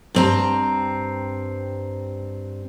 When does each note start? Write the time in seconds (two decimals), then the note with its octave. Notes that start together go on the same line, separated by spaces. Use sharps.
0.15 G2 C4 A#5